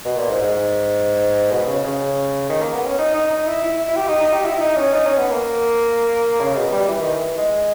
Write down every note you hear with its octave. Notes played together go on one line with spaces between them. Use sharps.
B2
A#2
G#2
G#2
B2
C#3
C#3
D#3
A#3
B3
C#4
D#4
D#4
D#4
E4
E4
E4
G4
D#4
D#4
G4
E4
E4
D#4
C#4
D#4
C#4
B3
A#3
C#3
B2
G3
E3
D#3
E3
G#3